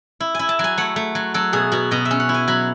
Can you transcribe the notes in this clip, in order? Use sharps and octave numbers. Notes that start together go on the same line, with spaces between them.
E4
E4 G#5
A5
F#3 G#5
A3 F#5
A3
F#3
F#3 A4
B2 G#4
B2 F#4
B2 D#5
E5
C#4
F#5
E4
G#5
F#3 B5